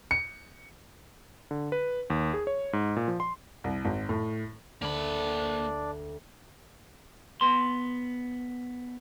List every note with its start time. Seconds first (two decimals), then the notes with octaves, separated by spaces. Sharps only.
0.11 C#7
1.51 D3
1.72 B4
2.10 D#2
2.34 G#4
2.47 C#5
2.73 G#2
2.96 A#2
3.08 F3
3.20 C6
3.64 C2
3.85 G#1
4.09 A2
4.82 D2 A#3 D4 D5 B5
7.41 B3 C6